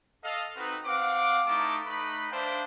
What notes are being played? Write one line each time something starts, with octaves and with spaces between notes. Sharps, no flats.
A4 D#5 F5
C4 D#4 F#4 B4
C4 F5 F#5 D6
A3 D#4 E4 A5 D6
A3 D#4 B4 B5
D4 C5 E5 F5 G5 A5